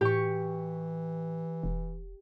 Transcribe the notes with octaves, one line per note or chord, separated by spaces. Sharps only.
A2 E3 G4 C#6
E1